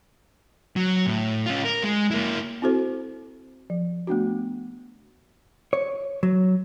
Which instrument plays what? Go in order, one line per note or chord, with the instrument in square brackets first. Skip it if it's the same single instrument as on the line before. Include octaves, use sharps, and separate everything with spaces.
[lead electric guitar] F#3
A2
C#4 F4
A#4
G#3
A#3 E4
[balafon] C4 E4 F#4 A4 C5
F3
A3 B3 D4 F#4
[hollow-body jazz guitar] C#5
F#3